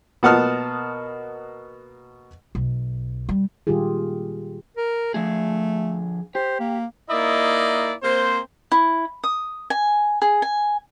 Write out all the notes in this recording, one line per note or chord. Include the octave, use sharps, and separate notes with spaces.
B2 A#3 F#5 A5 D#6 F6
B1
G3
A#2 D#3 G3 F4 G4 G#4
A#4
D3 F3 A3 G#4
G4 C5
A#3
A#3 D#4 E4 D5 D#5
A#3 C4 C5
E4
D#6
G#5
G#4
G#5